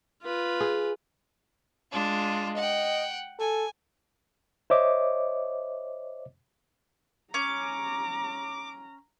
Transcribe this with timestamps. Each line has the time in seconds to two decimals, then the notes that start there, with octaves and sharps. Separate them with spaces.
0.22 F4 B4
0.60 G#4
1.92 G#3 D4 F4
2.56 D#5 F#5 G5
3.39 A4 G#5
4.70 C5 C#5 D#5 E5 D6
7.34 C#4 A#5 D6